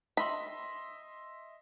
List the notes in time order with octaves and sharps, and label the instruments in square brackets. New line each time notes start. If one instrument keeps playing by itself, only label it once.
[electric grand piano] D#5 E5 C6 [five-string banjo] B5